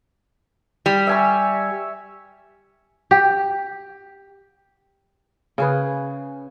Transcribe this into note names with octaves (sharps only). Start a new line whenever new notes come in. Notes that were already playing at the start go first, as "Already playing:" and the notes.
G3
E5 G#5 C#6
G4
C#3 G#4 B4